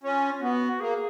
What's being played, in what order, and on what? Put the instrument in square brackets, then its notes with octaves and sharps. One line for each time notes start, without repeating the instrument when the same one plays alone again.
[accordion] C#4 [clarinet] F4
[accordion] B3 [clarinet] F#4
[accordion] A#3 [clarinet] G#4